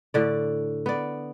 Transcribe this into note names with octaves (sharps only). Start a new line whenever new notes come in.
A2 D3 D5
B3 D5